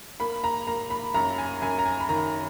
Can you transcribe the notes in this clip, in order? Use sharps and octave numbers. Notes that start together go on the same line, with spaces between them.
A#3 B5
A#5
A#3 A#5
B5
F#2 A#5
G#5
F#2 G#5
A#5
G#5
B5
D#3 A#5